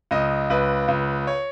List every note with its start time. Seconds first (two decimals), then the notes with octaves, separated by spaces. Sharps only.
0.11 C#2 D#5
0.50 C#2 B4
0.88 C#2
1.27 C#5